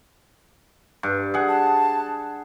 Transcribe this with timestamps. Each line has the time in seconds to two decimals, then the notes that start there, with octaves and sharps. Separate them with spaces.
1.03 G2
1.34 G#4 F#5
1.48 A5